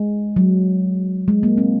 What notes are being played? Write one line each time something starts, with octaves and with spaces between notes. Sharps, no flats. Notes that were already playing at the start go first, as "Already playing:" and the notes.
Already playing: G#3
F#3
G#3
A#3
C4